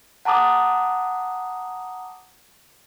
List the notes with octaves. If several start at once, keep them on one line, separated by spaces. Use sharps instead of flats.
F#5 A5 A#5 D6 D#6